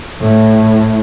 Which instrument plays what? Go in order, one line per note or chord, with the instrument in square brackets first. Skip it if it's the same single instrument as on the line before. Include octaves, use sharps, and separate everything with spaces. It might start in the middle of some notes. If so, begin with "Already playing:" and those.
[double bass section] A2